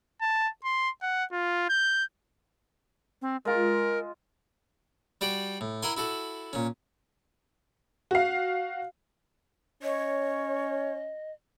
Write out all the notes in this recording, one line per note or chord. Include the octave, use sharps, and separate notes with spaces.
A5
C6
F#5
F4
G6
C4
G#3 F4 A#4
G3 F#4 D5 G5
A2
E4 A#4 F#5 G#5 C6
E4 F#4 A4
A#2 C#4
F#4 F5
C#4 C#5 D#5